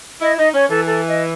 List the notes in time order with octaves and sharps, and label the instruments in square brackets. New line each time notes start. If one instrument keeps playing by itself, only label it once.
[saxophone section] E4 [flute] D#5
[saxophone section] D#4 [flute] D#5
[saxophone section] C#4 [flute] C#5
[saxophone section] E3 [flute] A4
[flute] A4
D#5